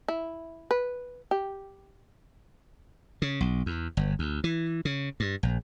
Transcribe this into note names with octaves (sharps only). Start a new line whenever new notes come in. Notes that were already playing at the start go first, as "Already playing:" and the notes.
E4
B4
G4
C#3
B1
E2
G1
D2
E3
C#3
G2
A#1